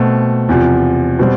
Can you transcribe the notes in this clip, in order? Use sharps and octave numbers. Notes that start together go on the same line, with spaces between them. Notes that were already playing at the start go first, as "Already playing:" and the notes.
Already playing: B2 A3 C4
E2 C3 F3
B2 G3 C4